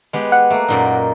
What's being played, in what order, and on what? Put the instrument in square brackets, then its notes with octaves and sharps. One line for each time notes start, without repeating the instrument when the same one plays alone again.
[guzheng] G#3 B3 G4
[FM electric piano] F#5
[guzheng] A3 A#3
F#2 A#2 D#4